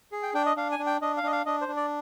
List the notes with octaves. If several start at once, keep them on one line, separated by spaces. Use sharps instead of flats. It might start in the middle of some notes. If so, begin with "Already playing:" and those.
G#4
G5
D4 G5
D#5
D4 F5
G#5
D4
G5
D4 D#5
F5
D4 D#5
F5
D4 D#5
C5
D4
D5